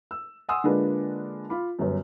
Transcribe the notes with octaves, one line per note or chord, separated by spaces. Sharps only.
E6
F#5 G#5 C6 D#6 E6
D3 G#3 A#3 D4 F4 B4
F4 B5 D6
G1 F#2